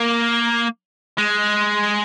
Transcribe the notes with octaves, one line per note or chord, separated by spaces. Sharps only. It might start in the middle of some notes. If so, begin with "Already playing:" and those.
Already playing: A#3
G#3